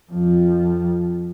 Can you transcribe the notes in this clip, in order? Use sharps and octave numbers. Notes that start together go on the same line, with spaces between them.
F2 F3